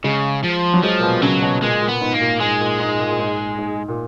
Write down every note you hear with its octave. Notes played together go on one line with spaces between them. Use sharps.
C#3 G#3
F3
F#3
F3 G#3
A#2
B2
C#3 F#3
B2
A#2 G#3
A#2
B3
G#2
A#3
A#2
G#2 G#3
A#2
G#2
A#2
A#2
G#2
G#2
A#2